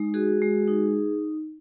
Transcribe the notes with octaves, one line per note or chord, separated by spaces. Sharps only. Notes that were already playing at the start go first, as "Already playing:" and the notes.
Already playing: G#3 D#4
F#4 G#4
G#3
D#4